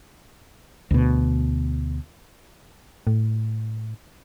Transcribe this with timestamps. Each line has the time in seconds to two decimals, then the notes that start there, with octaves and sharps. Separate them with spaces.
0.91 D2 B2
3.07 A2